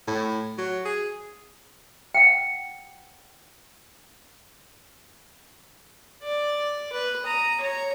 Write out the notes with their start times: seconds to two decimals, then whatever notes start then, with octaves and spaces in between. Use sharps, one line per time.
0.08 A2
0.58 F#3
0.85 G#4
2.14 F#5 G5
6.23 D5
6.93 B4
7.24 A#5 D#6
7.61 C#5 A#5